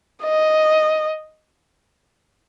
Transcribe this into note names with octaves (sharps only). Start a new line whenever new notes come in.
D#5